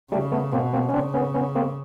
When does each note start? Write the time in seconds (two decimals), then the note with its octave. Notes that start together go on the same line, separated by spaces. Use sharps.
0.11 C#3 G3 A3
0.32 A3 B3
0.52 B2 A#3 C4
0.73 A#3 C4
0.89 C#4
0.93 C#3 C4 D4
1.14 B3 C#4
1.34 B3 C#4
1.55 A#3 C4